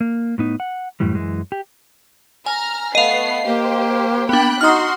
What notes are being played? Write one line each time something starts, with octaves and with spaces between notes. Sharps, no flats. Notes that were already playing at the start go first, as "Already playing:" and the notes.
A#3
A2 B3 D#4
F#5
F#2 A2 E3 G3
F#2 E3 G#3
G4
G#5 A#5 F6
A3 B3 D#5 F5 C7
A#3 G4 C5
B3 D4 G5 B5 F#6
D#4 F#4 C6 D#6 F6